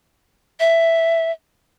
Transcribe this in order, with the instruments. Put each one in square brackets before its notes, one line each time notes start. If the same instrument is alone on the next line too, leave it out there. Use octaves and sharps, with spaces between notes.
[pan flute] E5